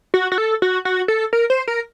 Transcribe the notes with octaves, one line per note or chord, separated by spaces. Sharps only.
F#4
F#4
A4
F#4
F#4
A4
A#4
C5
A#4